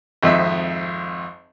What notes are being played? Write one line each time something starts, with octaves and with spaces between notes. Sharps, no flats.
G#1 F2 D#5 E5